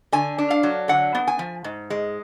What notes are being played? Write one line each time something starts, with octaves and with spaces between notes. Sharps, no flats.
D3 G#5
D4
F5
F#3
D3 F#5
B3
G#5
F3
G#2
G#3